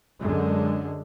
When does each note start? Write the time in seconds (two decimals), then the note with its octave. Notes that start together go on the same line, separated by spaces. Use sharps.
0.18 F#2 D3 G#3